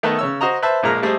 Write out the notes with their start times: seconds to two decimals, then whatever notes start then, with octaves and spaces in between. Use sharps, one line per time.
0.03 D#3 A3 B3 A4 B4 D#5
0.19 C#3 C#5 E6
0.41 F#4 C5 D#5 A#5
0.62 B4 C5 E5 A5
0.83 A#1 A#2 G#3 A#5 F6
1.02 G3 A3 G#4 C5 D#5